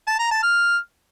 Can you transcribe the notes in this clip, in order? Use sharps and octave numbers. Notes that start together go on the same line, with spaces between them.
A5
A#5
A5
F6